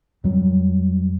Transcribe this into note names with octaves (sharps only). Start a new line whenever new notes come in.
F2 F#3 G3